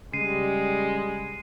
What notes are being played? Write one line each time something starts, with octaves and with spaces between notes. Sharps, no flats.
C#3 G3 G#3 C7 D#7